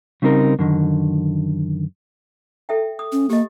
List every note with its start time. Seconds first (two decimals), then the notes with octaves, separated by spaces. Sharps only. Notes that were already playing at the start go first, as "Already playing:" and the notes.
0.22 C#3 G3 C4 D#4 G#4 A#4
0.59 F#2 D3 D#3
2.69 A4 E5 G5
2.99 D#6
3.12 C#4
3.30 A#3 G4 D#5